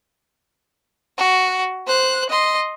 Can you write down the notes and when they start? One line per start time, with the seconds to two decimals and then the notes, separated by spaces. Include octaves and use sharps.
1.17 F#4
1.87 C5 F#6
2.30 D#5 C6